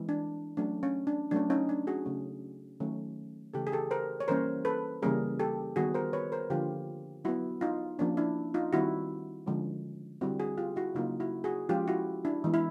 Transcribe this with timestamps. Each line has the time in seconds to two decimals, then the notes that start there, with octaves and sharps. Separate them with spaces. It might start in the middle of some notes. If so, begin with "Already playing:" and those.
Already playing: E3 G#3 C4
0.09 D4
0.57 F#3 A3 C#4 D4
0.83 C#4
1.07 D4
1.31 F#3 A3 C#4 D4
1.50 C#4 D#4
1.69 D4
1.87 F#4 G#4
2.06 C#3 F#3 A3 C#4
2.80 D#3 F#3 A3 C#4
3.54 C#3 E3 A3 G4 A4
3.67 G#4
3.72 G4 A4
3.91 A#4 C5
4.20 C#5
4.28 E3 G3 A#3 C#4 A#4 C5
4.65 A4 B4
5.02 C#3 E3 G3 A#3 C#4 G#4 A#4
5.40 G4 A4
5.76 D#3 G3 B3 F#4 G#4
5.94 A#4 C5
6.13 B4 C#5
6.32 A#4 C5
6.50 D3 F3 A#3 F4 G4
7.24 F#3 B3 E4 F#4
7.61 D#4 F4
7.99 F3 A#3 C#4 D4
8.17 D4 E4
8.54 D#4 F4
8.73 D#3 G3 C4 E4 F#4
9.46 D3 F3 G#3 C#4
10.21 D3 G3 C4 E4 F#4
10.40 F#4 G#4
10.58 F4 G4
10.76 E4 F#4
10.95 C#3 F#3 A#3 D#4 F4
11.20 E4 F#4
11.44 F#4 G#4
11.69 F3 G#3 C#4 F4 G4
11.88 E4 F#4
12.25 D4 E4
12.44 E3 G#3 B3
12.54 E4